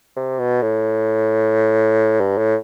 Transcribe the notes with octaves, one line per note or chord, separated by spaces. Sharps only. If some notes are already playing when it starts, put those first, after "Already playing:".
C3
B2
A2
G2
A2